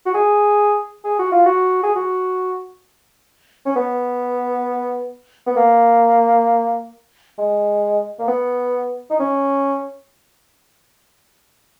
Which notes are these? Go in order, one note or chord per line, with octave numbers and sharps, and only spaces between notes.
F#4
G#4
G#4
F#4
F4
F#4
G#4
F#4
C#4
B3
B3
A#3
G#3
A#3
B3
D#4
C#4